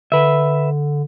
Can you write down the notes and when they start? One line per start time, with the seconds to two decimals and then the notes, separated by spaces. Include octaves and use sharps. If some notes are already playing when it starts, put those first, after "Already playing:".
0.12 D3 B4 E5